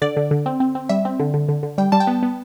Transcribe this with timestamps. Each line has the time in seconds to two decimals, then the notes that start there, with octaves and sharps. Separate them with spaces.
0.02 D3 D5
0.17 D3
0.31 D3
0.46 C4
0.60 C4
0.75 C4
0.89 G3 E5
1.05 C4
1.20 D3
1.34 D3
1.48 D3
1.63 D3
1.78 G3 G5
1.92 G3 A5
2.00 G5
2.07 B3
2.23 B3